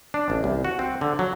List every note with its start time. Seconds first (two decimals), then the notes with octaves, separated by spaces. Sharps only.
0.14 D4
0.30 A1
0.44 C2
0.65 F#4
0.79 C4
1.01 D3
1.19 F#3